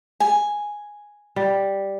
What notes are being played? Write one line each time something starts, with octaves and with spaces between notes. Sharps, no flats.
G#5
G3